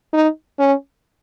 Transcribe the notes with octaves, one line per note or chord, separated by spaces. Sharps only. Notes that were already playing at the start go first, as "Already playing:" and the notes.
D#4
C#4